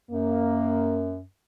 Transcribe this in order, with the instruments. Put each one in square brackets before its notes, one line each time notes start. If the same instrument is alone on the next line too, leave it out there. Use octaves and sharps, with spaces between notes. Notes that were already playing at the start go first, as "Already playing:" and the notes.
[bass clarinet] F#2 [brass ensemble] A#3